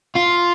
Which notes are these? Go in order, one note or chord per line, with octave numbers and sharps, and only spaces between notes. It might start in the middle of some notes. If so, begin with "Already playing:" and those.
F4